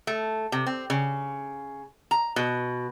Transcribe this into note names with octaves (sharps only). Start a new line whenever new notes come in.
A3
C3
C4
C#3
A#5
B2